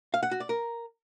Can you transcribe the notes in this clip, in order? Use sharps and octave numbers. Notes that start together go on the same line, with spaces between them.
F5
F#5
F#4
D5
A#4